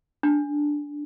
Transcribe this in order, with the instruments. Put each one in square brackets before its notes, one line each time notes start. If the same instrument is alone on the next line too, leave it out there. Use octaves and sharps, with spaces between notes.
[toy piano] D4